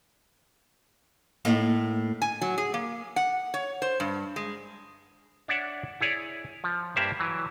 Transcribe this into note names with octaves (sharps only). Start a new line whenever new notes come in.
A2 A#3 D#4
G#5
F#3
G#4
A#3
F#5
C#5
C5
G2
G#3
D4 C#5 D5 E5 F#5
E4 G#4 C#5 D5
F3
G2 A#3 G4 C5 D5 E5
E3 F#3